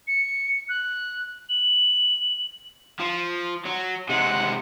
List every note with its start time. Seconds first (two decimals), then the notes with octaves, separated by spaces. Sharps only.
0.07 C#7
0.69 F#6
1.49 F#7
3.00 F3
3.65 F#3
4.09 C3 G#3 F#5